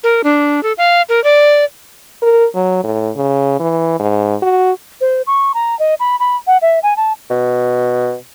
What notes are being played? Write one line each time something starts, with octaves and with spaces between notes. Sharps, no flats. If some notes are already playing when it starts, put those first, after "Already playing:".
A#4
D4
A4
F5
A#4
D5
A#4
F#3
A2
C#3
E3
G#2
F#4
C5
C#6
A#5
D#5
B5
B5
F#5
E5
G#5
A5
B2